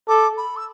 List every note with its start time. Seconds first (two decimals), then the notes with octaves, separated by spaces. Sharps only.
0.08 A4 D6
0.37 B5
0.57 E6